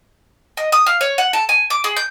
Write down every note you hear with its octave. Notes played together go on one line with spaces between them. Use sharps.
D#5
D#6
F5
C#5
F#5
A4
G#5
D6
G#4
G6